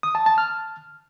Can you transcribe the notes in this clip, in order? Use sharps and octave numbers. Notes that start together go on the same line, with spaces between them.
D#6
A5
A5
F6